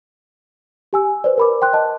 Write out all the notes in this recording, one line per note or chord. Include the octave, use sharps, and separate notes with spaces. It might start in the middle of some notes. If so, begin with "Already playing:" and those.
G4 G#5 E6
B4 C5 D5
A#4 B5 D6
G5 C6 F#6
D#5 A5